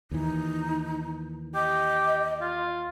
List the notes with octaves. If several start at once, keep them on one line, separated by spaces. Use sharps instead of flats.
D#2 E3 D#4
G4 D#5
F4